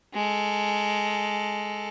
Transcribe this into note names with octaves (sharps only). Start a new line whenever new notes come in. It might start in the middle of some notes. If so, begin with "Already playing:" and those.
G#3 A4